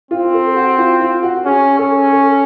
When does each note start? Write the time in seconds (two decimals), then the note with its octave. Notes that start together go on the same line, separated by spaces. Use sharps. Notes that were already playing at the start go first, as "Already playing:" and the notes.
0.11 C4 F4
0.34 A4
0.56 F#4
0.78 F4
1.00 F4
1.23 F#4
1.45 C#4 G#4
1.78 C#4 A4
2.12 A4